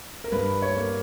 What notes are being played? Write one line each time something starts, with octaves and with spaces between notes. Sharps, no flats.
A#4
G2 B4
C#5
A#3